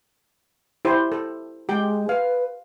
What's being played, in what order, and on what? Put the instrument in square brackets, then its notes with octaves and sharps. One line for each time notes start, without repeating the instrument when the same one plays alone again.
[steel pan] E4 G4 C5
A4
[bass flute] G#3 [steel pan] G4 G5
[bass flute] B4 [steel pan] F5